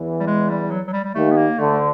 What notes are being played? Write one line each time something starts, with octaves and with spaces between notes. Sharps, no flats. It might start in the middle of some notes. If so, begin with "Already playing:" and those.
Already playing: E2 E3
G3
G#3
G3
F#3
F#3
G3
G3
D#2 D#3 A3
B3
A#3
D2 D3 A3